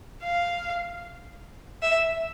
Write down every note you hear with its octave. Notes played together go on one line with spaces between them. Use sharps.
F5
E5